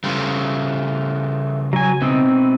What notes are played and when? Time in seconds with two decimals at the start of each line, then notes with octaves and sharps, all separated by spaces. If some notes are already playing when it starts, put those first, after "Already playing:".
0.04 C#3 E3 G3 A3 F4
1.73 F#3 G#5
2.02 B2 E3 C4 D#4